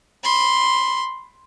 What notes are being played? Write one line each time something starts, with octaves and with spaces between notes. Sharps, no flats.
B5 C6